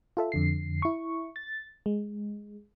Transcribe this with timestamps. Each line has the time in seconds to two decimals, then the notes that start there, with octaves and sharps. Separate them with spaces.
0.17 F4 A4 E5
0.32 F2 D3 C7
0.82 E4 C#6
1.36 A6
1.86 G#3